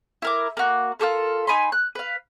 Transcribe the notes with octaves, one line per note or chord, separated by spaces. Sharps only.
E4 A#4 D6
A#3 F#4
F4 G4 A4 A#4
D#4 G#5 B5 C6
F#6
B4 F5